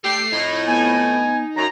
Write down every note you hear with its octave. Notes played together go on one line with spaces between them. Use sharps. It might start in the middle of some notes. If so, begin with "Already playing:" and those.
D3 A3 G4 C7
F2 A2 D#4
B3 G#5
F#2 A#5